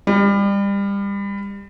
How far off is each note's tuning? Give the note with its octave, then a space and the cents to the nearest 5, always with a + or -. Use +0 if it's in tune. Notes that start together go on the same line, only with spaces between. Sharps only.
G3 +30